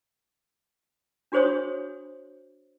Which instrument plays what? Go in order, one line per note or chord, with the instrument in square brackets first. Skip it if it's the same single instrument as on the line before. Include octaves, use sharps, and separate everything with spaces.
[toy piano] D4 F#4 G#4 C5 C#5 D#6